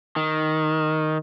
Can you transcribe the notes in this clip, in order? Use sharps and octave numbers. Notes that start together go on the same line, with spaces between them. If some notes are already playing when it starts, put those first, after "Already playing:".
D#3